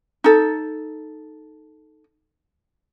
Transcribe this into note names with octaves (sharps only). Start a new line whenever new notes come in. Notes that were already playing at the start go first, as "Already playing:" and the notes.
D#4 A4